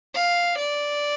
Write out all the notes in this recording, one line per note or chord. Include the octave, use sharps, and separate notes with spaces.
F5
D5